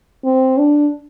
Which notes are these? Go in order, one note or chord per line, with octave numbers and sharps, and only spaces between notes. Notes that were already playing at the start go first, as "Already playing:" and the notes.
C4
D4